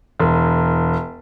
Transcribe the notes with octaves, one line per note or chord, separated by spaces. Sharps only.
E1